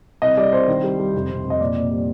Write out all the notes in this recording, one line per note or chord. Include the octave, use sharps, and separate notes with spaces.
C2 D#5
G3 D5
C2 C5
D#3
G3
G3
F1
F1
F1
D#5
A#2 D5
A#2
G3